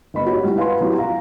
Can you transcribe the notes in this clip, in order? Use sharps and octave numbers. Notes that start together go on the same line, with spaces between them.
G1 D#5 B5
D#4 F#4 G4 C#5
G3 E4
B4 F5 F#5 G#5 B5 C6
F#3 E4 G4
F5 A#5